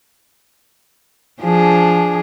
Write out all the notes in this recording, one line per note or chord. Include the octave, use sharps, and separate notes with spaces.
F3 D4 G#4